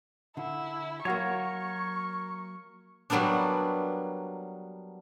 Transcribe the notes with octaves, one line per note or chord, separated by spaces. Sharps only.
D3 E4
F#3 A#3 F#4 A#4 C#5 F#5 A5 C#6
F#3 G3 A#3 B3 D4